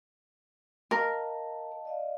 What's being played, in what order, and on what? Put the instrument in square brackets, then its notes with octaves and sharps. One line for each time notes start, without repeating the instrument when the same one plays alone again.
[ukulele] A#4 [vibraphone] D#5 F5 A5
[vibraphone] D5 D#5 F5